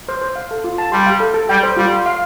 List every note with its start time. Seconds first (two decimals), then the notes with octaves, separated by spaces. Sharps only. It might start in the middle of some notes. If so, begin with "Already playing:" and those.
0.09 C5
0.21 C5
0.36 F5
0.51 A4
0.64 F4
0.78 A5
0.92 G3 C6
1.06 F5
1.20 A4
1.34 A4
1.49 G3 G5
1.63 C5
1.77 G3 F4
1.91 C6
2.06 F5